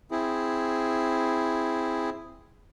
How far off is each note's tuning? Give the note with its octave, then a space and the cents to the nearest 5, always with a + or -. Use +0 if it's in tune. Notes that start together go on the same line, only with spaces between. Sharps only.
C4 +0 E4 +5 G#4 +0